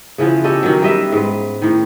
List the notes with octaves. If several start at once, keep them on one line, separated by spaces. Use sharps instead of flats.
C#3 E3 F3 B3
C#4 G4 A4 D#5
D#3 F#3
G3 B3 D#5 E5
G#2 B4
A2 D#3